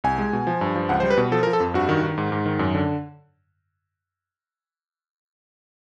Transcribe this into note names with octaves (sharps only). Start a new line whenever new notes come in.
C2 G#5
G#3
B2
F3
G2
F3
C#2 F#5
C5
G3
B4
B2
F3 A4
A#4
F3
A4
F2
G2 F#4
D#3
D#3
G#2
G#2
D#3
F#2
D3